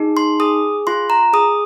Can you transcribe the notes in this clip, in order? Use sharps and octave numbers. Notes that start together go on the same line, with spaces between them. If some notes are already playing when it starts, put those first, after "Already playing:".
Already playing: D#4 G#4
C6
G#4 D#6
F4 C6
A#5
G#4 D#6